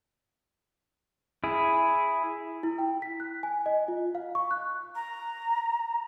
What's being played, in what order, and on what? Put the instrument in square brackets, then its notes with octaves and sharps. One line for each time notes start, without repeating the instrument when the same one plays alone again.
[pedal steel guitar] E4 G#4
[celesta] E4
G5
B6
F#6
G#5
D#5
F4
F5
C#6
F#6
[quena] A#5